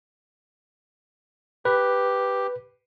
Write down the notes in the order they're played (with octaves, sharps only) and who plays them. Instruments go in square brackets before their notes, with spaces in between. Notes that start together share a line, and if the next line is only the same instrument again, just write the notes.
[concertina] G4 [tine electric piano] B4